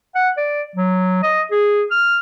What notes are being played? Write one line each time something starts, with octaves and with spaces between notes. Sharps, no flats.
F#5
D5
F#3
D#5
G#4
F6